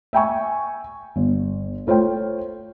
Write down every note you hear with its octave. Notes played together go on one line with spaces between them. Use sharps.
E5 G5 G#5 C#6
G1
A3 F4 C5 C#5 G5